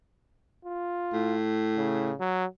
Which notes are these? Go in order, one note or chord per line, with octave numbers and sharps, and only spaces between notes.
F4
A2
C#3
F#3